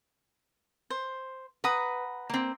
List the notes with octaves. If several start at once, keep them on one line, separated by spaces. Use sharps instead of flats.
C5
B4 F#5 A#5 D#6
A#3 C4